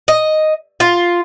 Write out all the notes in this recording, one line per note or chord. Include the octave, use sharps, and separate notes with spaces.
D#5
F4